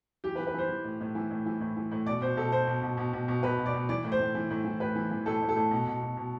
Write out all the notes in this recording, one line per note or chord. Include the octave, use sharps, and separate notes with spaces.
E3 G4
B4
E3
B4
E3 C5
E3
A2
A2
E3
A2
E3
A2
E3
A2
B2 D5
B2 C5
B2 A4
B2 C5
B2
B2
B2
B2
B2
B2 B4
B2
D5
B2
E3 D5
A2
C5
A2
E3
A2
E3
A2 B4
E3
E3
A2 A4
A2
A4
A2
B2
B2
B2
B2